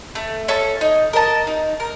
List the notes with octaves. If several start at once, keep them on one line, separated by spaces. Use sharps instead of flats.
A3
C#4 A4
D#4
A#4 D#5 A5
D#4
A#4